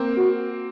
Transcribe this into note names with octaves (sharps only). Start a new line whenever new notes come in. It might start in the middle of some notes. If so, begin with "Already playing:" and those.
Already playing: A#3 C4
F#4